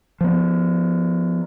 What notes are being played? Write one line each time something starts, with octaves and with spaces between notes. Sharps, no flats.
F3 B3